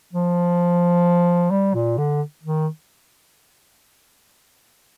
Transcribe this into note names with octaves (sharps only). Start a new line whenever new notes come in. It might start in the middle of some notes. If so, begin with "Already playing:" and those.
F3
G3
A#2
D3
D#3